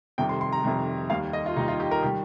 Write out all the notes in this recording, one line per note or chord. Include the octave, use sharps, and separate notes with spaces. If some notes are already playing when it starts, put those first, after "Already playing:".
F1 F2 C3 D#3 G3 G5
C6
C6
A#5
F1 F2 C3 D#3 G3
D#2 D#3 G3 F5
D#5
F4
D#2 D#3 G3 D#4
F4
G4
A#4
D#3 G3 G4